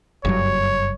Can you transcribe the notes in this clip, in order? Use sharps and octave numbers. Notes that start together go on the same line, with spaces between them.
F#1 G2 F#3 C#5